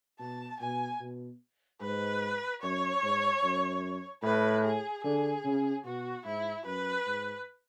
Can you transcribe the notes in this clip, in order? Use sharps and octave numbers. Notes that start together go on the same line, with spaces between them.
B2 A5
B2 G#5
B2
G#2 B4
F#2 C#5
G#2
F#2
A2 B4
G#4
D3 G#4
C#3
B2 F#4
G#2 E4
F#2 B4
G#2